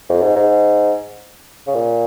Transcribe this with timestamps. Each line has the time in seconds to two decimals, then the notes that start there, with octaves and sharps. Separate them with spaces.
0.09 F2
0.22 G#2
0.36 G#2
1.67 C#3
1.74 A#2